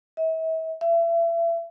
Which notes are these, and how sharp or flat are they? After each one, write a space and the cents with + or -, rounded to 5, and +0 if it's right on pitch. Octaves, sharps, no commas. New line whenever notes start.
E5 -40
E5 +35